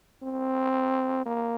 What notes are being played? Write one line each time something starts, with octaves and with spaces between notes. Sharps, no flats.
C4
A#3